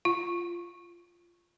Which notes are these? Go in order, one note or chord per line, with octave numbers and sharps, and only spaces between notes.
F4